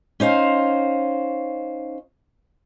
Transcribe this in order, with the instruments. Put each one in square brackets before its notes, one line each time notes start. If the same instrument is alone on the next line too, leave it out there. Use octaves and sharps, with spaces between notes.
[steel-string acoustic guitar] C#4 D#4 C5 F5